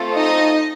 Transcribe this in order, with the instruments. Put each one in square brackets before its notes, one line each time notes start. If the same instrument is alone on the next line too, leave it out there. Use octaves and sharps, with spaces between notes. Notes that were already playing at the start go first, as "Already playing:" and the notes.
Already playing: [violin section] A3 C4 F4 A4
D#4 D#5